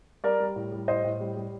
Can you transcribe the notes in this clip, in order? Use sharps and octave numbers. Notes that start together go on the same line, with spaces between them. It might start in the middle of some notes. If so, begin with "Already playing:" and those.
G3 A#4 D5
G3
A2
G3
A2 C5 D#5
A2
G3
G3